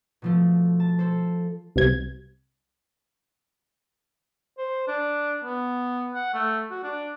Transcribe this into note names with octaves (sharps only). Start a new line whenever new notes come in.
B2 F3 A3
A5
A4 C5
C2 C3 G#6
C5
D4
B3
F#5
A3
F#4
D4